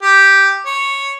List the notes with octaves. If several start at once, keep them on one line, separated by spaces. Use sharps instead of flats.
G4
C#5